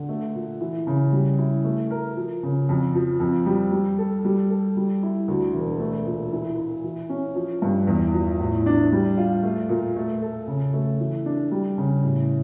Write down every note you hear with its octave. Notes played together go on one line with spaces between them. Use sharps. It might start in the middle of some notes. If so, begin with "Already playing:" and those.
Already playing: D3
A3
A#2
E3
C#3
G3
E4
A3
A#4
F3
C#3
F2
F3
F2
G3
G3
A4
G3
A4
G3
E4
D2
E1
A3
A#2
E3
E4
E3
C#4
F3
G2
E2
F3
A2
D4
G3
F4
A3
A#2
A3
A4
C#3
A3
E3
D4
G3
C#3
A2